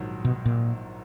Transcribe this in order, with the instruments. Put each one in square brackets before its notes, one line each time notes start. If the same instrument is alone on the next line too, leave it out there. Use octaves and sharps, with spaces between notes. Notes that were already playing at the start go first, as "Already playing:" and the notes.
Already playing: [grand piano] A#1 G#2 D#3 F#3
[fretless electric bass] B2
A#2